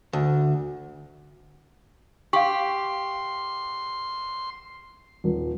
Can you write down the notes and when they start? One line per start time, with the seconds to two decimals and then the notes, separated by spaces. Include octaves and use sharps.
0.13 D2
2.33 G4 F5 C6 C#6
5.24 D#1